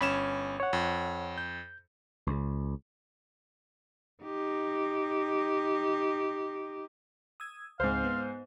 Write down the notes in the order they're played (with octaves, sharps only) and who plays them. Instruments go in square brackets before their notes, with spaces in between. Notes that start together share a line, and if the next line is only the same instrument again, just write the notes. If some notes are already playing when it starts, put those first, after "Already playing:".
[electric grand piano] G1 C#4 E7 [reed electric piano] B5
[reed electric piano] C#5 F#5
[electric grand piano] F2
[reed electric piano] G6
[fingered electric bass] C#2
[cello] D#4 G4
[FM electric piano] D#6 E6 G#6
[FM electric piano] C#2 C4 [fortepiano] G#2 C5 [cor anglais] F5
[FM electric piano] B3